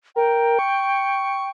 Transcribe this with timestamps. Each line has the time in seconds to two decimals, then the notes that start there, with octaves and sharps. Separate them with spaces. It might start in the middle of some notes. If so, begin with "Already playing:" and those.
0.16 A#4 G5
0.59 C#6